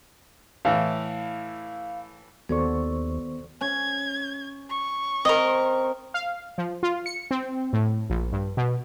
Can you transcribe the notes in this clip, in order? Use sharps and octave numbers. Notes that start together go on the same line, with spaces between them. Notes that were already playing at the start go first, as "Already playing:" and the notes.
A2 E3 F5
D#2 D#3 B3 F#4 A4 C5 D5 C#6
C#4 G#6
C#6
C4 A#4 D#5
F5
F3
F4
C#7
C4
A2
A#1
G2
B2